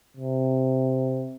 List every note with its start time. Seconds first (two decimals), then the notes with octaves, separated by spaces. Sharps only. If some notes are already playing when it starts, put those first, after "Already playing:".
0.17 C3